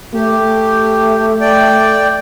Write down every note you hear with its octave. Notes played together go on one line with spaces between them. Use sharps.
A3 G4
D5 G5